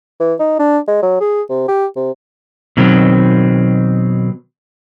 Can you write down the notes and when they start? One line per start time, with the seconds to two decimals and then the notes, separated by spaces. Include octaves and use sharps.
0.20 E3
0.40 D#4
0.59 D4
0.87 G#3
1.02 F#3
1.21 G#4
1.49 C3
1.68 G4
1.96 C3
2.77 B2 D#3 F#3 C4